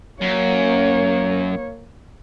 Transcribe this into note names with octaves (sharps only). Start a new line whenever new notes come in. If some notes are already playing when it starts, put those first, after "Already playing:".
F#2 A#3 C#5